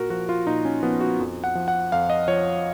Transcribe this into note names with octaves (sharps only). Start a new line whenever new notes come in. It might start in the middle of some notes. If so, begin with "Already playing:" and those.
Already playing: A#2 F#4 A#4
F3 F#4
F4
A#2 D#4
C#4
F3 B3
F#4
F2
F#5
F3
F#5
F2 F5
D#5
F3 C#5